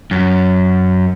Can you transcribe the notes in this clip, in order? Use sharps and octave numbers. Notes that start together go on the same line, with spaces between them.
F#2